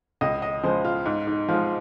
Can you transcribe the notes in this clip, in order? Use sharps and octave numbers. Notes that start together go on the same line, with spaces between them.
C#2 D#5
D#5
C#3 F3 G#3 C5
F4
G#2
D#4
F3 G#3 F4